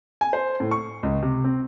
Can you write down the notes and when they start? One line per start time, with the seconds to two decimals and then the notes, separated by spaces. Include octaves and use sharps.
0.21 G#5
0.33 C5
0.60 A2
0.71 C#6
1.03 C#2
1.22 C3
1.44 C4